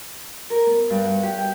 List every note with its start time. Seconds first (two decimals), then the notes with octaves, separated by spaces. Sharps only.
0.50 A#4
0.66 B3
0.90 G2
1.05 F#5
1.23 G4
1.38 G5